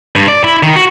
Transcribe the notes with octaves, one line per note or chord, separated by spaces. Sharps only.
G2
D5
E4
D#3
F#4